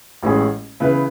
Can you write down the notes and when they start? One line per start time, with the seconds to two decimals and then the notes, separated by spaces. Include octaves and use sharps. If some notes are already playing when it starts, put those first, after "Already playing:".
0.23 A1 A2 G#3 C#4 G#4
0.80 C#3 E3 B3 E4 B4